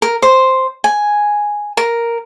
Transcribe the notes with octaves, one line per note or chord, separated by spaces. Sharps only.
A#4
C5
G#5
A#4